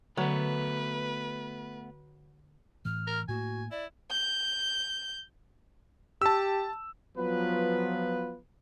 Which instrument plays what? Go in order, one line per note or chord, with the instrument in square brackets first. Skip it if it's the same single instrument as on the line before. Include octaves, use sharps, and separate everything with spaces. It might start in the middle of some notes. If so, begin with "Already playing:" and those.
[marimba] D3 [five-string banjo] F#3 [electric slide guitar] A3 B3 [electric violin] B4
[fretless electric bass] A2 E3 [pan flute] F6
[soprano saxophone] A#4
[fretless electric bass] A2 A#3 [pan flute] F#4 [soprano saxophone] G#5
[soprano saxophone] E4 [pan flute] D5
[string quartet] G6
[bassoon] G4 [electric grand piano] A5 E6
[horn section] F3 F#3 B3 F4 B4